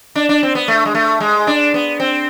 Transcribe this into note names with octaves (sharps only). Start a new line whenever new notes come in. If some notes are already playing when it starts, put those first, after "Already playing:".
D4
D4
C4
B3
A3
G#3
A3
G#3
D4
B3
C4